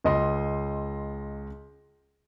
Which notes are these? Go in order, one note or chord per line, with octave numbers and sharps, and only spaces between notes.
C#2 D#5 C6